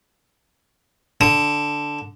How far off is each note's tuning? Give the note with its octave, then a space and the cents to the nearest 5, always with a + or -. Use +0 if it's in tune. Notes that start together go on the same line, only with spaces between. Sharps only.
D3 +0 D#6 +15